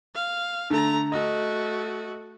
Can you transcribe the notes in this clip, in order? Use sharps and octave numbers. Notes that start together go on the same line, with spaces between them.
F5
D3 A3 A#5
A3 F#4 D#5